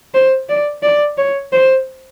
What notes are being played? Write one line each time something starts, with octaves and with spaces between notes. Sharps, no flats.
C5
D5
D5
C#5
C5